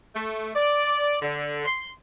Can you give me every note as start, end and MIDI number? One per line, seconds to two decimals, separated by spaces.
0.15 0.50 57
0.55 1.16 74
1.21 1.65 50
1.65 1.88 84